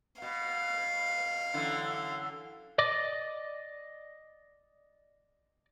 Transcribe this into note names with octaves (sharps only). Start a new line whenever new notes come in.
B2 F5
F#2 D3 E3
D5 D#5 D6